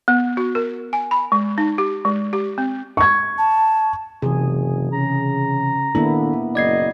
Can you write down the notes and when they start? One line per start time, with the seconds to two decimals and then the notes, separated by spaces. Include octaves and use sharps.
0.08 B3
0.37 F#4
0.55 A#4
0.93 G#5
1.11 B5
1.32 G#3
1.58 D#4
1.78 G4
2.05 G#3
2.33 G4
2.58 C4
2.97 C#6 G#6
3.38 A5
4.22 F#1 C3 E3 G#4
4.93 C#3 A#5
5.95 D#3 A#3 B3 D4 E4 A4
6.55 F#1 D5 D#5 G#6 C7